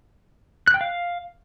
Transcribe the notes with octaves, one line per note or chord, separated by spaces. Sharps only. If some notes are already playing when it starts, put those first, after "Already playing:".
F#6
G5
F5